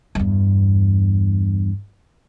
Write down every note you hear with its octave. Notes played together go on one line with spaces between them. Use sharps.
E2 G2